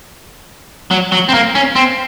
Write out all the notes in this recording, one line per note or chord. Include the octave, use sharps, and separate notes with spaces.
F#3
F#3
C4
A#3
C#4
C4